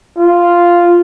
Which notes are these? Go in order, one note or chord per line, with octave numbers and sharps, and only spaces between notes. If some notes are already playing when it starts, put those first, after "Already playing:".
F4